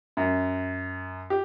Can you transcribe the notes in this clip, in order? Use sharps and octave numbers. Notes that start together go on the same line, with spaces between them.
F#2
G4